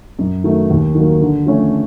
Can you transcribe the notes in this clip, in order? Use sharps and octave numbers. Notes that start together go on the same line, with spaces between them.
F#2
D#3 F#3 A3
D#2
D#3 F#3 A#3
D3
F3 A3 C#4